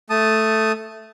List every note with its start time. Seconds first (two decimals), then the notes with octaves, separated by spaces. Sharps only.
0.10 A3 A5 D#6